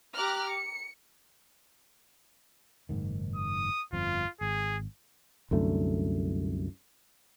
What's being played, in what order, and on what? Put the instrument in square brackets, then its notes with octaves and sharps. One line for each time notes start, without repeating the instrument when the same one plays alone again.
[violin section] G4 A#5 D6 F6 F#6
C#7
[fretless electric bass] F#1 G#2 D#3
[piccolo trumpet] D#6
[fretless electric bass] G1 F2 F3 [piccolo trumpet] F4
[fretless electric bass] G#1 [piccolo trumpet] G#4
[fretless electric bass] C2 F#2 D3 A3